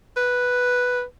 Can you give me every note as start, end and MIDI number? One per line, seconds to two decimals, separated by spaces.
0.17 1.02 71